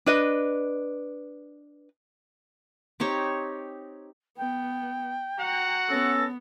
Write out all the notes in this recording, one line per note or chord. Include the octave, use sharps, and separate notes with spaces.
D4 B4 D#5
C4 D#4 G4 C#5
B3 G5
F#4 F#5 A#5
B3 C#4 A4 A#6